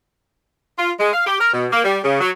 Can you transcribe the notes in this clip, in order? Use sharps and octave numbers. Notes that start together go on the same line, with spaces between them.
F4
G#3
F5
G4
A#4
B2
A#3
G3
C#3
F#3